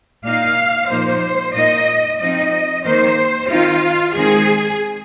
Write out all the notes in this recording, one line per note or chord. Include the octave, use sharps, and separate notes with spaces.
A#2 A#3 D#4 F5
A#2 F3 A#3 D#4 C5
A#2 A#3 D#4 D#5
F3 C4 D#4 D#5
D#3 A#3 D#4 C5
D#3 C4 D#4 F4
D#3 G#3 C4 D#4 G#4